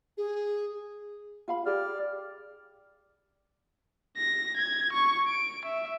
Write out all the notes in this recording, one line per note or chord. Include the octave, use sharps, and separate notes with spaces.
G#4
F4 F5 B5
G4 G#4 D5 F6
A#6
G#6
C#6
D7
E5